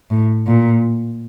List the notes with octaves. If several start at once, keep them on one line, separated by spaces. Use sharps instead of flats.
A2
A#2